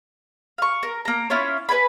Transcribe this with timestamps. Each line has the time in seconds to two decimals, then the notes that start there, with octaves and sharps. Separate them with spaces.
0.58 F5 C#6
0.83 A#4
1.05 A#3 A#5
1.30 C#4 E4 F4 C#5
1.69 B4 D5 G#5 B5